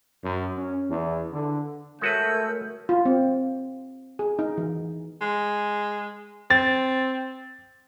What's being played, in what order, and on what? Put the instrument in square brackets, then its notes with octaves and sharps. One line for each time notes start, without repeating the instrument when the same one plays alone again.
[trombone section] F#2
C#4
E2
D3
[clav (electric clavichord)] G#3 F#4 B4 [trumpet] A3 [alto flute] A#4 [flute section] C#5 E6 G6
[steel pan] F4
C4
G#4
D#4
E3
[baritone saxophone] G#3
[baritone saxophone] C4 [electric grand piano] A6